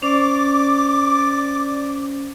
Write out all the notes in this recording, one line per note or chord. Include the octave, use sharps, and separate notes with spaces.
C#4 C5 D5 D6